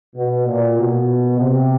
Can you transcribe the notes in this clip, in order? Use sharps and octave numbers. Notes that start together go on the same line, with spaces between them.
B2
A#2
B2
C3